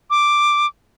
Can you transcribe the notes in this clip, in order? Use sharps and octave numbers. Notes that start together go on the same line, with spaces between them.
D6